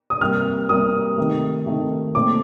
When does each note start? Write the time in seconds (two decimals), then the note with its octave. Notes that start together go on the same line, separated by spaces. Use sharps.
0.10 D#6
0.20 C2 C3 G3 A#3 F6
0.69 C2 C3 G3 A#3 D#6
1.18 C3 D#3 A3
1.66 C3 D#3 A3
2.15 A#2 A3 C4 D6